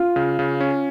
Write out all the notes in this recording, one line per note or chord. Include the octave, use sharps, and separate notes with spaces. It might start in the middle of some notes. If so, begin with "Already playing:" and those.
Already playing: F4
C#3
C#3
C#4